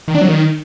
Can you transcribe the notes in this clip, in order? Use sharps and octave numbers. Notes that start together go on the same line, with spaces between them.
D#3
D4
F#3
D#3